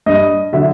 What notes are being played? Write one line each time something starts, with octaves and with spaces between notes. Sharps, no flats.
G2 D#5
D3 F#3 E5